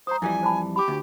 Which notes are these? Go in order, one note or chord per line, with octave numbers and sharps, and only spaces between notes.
C5 A#5 D#6
F2 E3 G3 G#5
C5 A5 B5
G4 B5 D6
D2